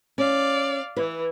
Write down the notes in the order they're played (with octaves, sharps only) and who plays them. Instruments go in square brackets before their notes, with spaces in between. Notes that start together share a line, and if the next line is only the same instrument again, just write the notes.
[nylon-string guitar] C#4 [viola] D5 F5
[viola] E3 [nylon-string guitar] B4